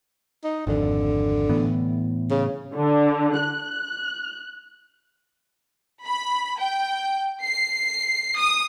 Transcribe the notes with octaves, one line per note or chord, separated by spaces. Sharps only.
D#4
G#1 F2 D3
A2 E3 B3
C#3
D3
F#6
B5
G5
C7
D#6